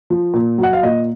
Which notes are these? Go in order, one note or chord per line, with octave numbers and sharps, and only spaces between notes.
F3
A#2
F#3 F#5
F5
A#2 D#5